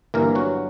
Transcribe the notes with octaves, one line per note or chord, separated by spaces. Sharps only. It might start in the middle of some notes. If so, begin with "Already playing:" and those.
G1 G2 E3 A#3 A#4
F#3 F#4